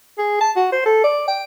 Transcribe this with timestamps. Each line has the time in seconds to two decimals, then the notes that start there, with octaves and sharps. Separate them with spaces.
0.18 G#4
0.41 A5
0.56 F#4
0.72 C5
0.86 A4
1.04 D5
1.28 G5